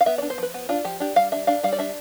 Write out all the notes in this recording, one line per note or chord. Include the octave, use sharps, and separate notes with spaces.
F5
B3 E5
D5
D4
C5
F3 B4
B3
D4 F4
F3 G4
D4 G4
G3 F5
D4 E5
D4 F5
G3 F5
D5
D4 E5